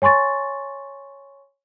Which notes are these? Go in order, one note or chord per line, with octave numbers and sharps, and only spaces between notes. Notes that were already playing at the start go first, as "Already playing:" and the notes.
C#5 G#5 C6 C#6 A6